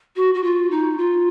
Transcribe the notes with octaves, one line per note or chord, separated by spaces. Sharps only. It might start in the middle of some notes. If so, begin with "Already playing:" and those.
F#4
F#4
F4
D#4
F4